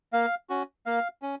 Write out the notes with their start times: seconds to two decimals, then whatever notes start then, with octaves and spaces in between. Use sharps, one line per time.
0.13 A#3 F5
0.50 C#4 F#4
0.86 A#3 F5
1.22 C#4